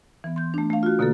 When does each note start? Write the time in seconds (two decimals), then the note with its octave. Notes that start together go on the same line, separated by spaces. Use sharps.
0.24 E3 B3
0.36 C6 G6
0.54 A3 D4
0.70 A3 F5
0.83 F4 F#4
0.99 B2 D3 A#3 F#4 A4